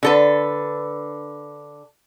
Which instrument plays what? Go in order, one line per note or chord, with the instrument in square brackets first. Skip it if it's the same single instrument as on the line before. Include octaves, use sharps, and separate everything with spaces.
[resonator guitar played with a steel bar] D3 A4 B4